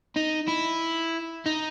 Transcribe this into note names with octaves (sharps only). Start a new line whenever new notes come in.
D#4
E4
D#4